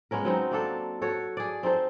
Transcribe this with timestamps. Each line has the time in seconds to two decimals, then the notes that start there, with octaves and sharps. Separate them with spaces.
0.11 G#3 B3 C#4 A#4
0.25 F#3 C4 D#4
0.51 A#3 D4 A4
1.01 F#4 A4 C#5
1.37 G#4 D5
1.63 C4 D#4 A4 C5